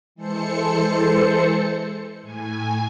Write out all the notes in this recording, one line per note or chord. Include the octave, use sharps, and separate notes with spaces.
E3 G#3 A4 C5 C#7
A2 G#5